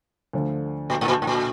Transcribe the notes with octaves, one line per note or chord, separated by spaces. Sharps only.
D2 D3 F3 A3
A#2
A2
A#2
A2
A#2